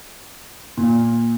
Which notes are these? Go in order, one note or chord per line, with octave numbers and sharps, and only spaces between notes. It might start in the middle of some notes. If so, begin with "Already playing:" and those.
A#2